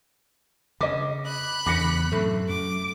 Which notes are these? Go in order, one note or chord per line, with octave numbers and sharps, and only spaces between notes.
C#3 D#5 D6
B5 F#6
E2 C#3 D6 A#6 C#7
F#2 A2 C3 A3
F#2 D6